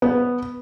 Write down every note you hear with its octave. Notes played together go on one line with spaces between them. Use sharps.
B3